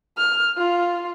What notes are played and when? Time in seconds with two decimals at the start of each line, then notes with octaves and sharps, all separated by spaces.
0.18 F6
0.58 F4